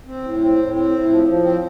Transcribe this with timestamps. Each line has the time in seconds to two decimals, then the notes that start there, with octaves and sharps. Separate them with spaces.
0.07 C4
0.24 A2
0.41 C4
0.58 A2
0.75 C4
0.92 A2
1.09 F3
1.27 F3
1.43 C4